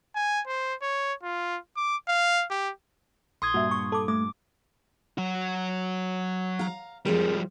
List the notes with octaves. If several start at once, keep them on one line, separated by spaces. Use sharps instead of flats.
G#5
C5
C#5
F4
D6
F5
G4
A#1 C6 D#6 G#6
G2 A#2 F#4 E5
C#6
A4 D6
A3 D6
F#3 F#4
F5 A#5
F2 F3 G3 G#3 A#4